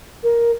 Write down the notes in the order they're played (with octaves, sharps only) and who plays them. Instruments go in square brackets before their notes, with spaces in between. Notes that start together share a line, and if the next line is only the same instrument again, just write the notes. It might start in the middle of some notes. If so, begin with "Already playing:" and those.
[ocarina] A#4